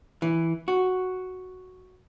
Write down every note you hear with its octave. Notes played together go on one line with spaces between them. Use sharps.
E3
F#4